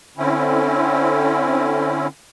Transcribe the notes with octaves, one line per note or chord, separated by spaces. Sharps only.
D3 C4 C#4 E4